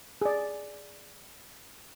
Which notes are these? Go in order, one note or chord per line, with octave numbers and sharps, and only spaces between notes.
G#4 D5